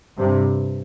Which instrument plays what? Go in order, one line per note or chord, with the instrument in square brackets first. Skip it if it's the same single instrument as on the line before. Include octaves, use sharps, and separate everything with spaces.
[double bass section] G2 C3